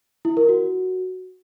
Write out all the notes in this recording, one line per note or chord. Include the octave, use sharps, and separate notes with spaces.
E4
A#4
F#4